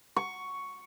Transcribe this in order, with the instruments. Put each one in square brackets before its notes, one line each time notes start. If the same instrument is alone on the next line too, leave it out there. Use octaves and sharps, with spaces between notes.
[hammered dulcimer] C#6